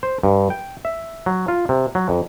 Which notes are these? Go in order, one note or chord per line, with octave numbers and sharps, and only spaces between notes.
C5
G2
G5
E5
F#3
F4
C3
F#3
F2